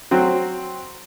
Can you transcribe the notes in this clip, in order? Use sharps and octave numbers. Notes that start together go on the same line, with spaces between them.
F#3 C4 F#4